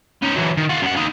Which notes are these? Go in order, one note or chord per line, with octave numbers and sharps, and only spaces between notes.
C#4 D#4
E3 F#3
D#3
F4 F#5
F#2 F#5
D#4 F5